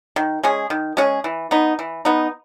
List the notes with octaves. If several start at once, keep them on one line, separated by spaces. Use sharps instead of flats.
D#3
G#3 C#4 G#4
D#3
G#3 C#4 G#4
E3
B3 D#4
E3
B3 D#4